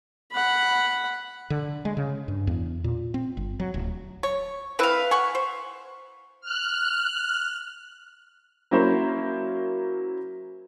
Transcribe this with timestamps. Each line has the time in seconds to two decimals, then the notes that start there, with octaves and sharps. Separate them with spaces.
0.32 F#5 B5
1.50 D3
1.85 G#3
1.97 C#3
2.28 G2
2.47 E2
2.84 A#2
3.14 C4
3.37 G1
3.60 F#3
3.74 D1
4.23 C#5
4.79 C4 E4 B4 F5
5.11 F#5 G#5 C#6
5.35 C5
6.41 F6 F#6
8.71 F#3 A#3 C#4 E4 A#4 C5